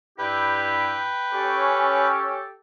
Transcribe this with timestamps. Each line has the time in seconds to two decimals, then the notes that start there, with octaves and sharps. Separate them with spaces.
0.19 G2 E4 G4 B4 G5
1.32 C#4 G4 A4 C#5